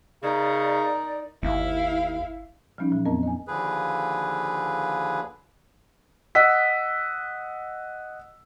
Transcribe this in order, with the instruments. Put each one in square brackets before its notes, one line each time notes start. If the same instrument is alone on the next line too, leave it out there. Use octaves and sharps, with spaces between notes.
[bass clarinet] C#3 [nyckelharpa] D#4 A#4 [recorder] D5
[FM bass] G1 [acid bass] D#2 [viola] E4 F5
[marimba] F3 G3 C#4 D#4
A#2 F#3
F2 B3 C4 A#4 D#5 A5
D#5 G#5
[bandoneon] D#2 D3 F3 G#4 B4
[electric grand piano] D#5 F#5 E6 B6